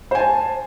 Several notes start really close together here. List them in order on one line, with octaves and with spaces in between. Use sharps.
C5 G#5 A5